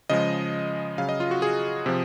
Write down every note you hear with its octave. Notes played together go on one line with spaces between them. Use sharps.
C#3 F3 G#3 D#5
C#3 F#3 F5
D#5
F4
F#4
G#4
C3 F3